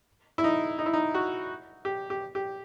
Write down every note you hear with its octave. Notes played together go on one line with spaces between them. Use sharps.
E4
D#4
D#4
E4
D#4
F#4
G4
G4
G4